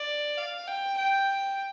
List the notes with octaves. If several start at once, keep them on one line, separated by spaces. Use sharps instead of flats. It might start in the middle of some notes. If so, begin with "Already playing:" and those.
Already playing: D5
F5
G5
G5